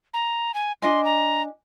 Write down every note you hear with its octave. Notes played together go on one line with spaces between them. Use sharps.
A#5
G#5
D4 D#5 G#5 C6
A#5